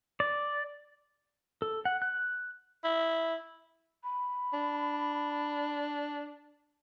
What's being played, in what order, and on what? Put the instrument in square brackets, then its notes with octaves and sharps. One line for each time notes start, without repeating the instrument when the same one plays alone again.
[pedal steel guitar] D5
A4
F#5
F#6
[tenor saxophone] E4
[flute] B5
[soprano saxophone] D4